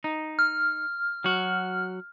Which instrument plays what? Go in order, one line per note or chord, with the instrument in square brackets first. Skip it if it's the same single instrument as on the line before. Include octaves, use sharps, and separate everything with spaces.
[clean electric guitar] D#4
[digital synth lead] F6
[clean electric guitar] F#3 F#4